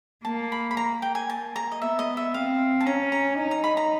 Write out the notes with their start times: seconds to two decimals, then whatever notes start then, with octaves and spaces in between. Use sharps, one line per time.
0.25 A#3 A5
0.52 B5
0.71 B5
0.77 A#5
1.02 G5
1.15 G#5
1.30 A#3 A5
1.56 A#5
1.72 D#5
1.82 B3 E5
1.99 D#5
2.17 E5
2.33 C4 F5
2.81 A5
2.86 C#4 A#5
3.12 A#5
3.38 D#4
3.51 A#5
3.64 B5
3.77 A#5